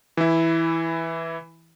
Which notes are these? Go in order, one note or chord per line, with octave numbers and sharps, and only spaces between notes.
E3 E4